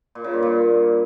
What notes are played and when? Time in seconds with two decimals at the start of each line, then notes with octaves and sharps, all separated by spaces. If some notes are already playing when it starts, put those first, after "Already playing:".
0.15 A#2
0.24 C#3
0.33 G2
0.43 A#2